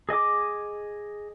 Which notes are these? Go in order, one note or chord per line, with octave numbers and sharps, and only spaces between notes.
G#4 D#5 G#5 D6